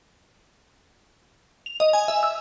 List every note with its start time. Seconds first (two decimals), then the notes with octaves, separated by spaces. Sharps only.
1.66 F7
1.80 D#5
1.93 G#5
2.08 E5
2.23 E6